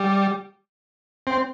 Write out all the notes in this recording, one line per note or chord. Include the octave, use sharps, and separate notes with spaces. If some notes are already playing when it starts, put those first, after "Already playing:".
Already playing: G3
C4